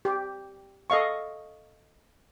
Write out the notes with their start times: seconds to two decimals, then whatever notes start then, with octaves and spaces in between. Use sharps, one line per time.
0.05 G4
0.90 A4 D#5 F5 C#6